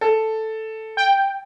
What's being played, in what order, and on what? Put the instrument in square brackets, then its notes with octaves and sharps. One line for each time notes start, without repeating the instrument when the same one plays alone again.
[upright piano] A4
[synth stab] G5